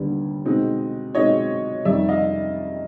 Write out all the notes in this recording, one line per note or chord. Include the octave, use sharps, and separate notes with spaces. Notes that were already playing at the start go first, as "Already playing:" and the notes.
Already playing: D#2 D3 G3 B3 D4
B2 G#3 C4 D#4
B2 G#3 C4 D#4 C#5 D#5
F2 C3 D#3 G3 D5 E5
D#5 F5